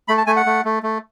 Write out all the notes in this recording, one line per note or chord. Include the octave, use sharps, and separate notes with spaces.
A3 B5
A5
A3 G#5
F#5
A3
A3
A3